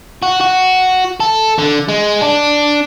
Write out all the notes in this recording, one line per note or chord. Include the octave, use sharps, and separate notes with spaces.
F#4
F#4
A4
D3
G#3
D4